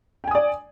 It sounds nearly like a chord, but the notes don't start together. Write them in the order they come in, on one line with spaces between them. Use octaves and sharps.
G5 G#5 D#6 D5